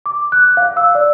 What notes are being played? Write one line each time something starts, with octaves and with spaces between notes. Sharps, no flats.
D6
F#6
F5
E6
D5